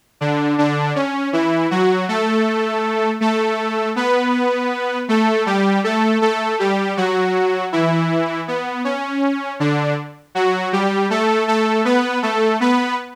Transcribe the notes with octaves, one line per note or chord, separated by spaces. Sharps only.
D3 D4
D3 D4
C#4
E3 E4
F#3 F#4
A3 A4
A3 A4
B3 B4
A3 A4
G3 G4
A3 A4
A3 A4
G3 G4
F#3 F#4
E3 E4
B3
C#4
D3 D4
F#3 F#4
G3 G4
A3 A4
A3 A4
B3 B4
A3 A4
B3 B4